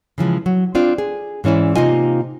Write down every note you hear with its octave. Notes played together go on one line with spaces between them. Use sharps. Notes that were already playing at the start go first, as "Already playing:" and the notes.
C#3 E3 F3 G#3
F#3
C4 D4 F4 D5
G#4
G#2 E3 C#4 E4 D5
C3 A#3 D#4 F4 D#5 G#5